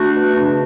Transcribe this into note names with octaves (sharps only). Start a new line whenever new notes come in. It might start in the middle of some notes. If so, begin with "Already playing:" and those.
Already playing: A3 D4 F#4
B2
C#3 D4